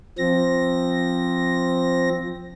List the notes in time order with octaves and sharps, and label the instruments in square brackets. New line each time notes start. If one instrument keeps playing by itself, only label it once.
[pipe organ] F3 C4 A#6